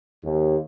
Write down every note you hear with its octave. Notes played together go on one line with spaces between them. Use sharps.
D#2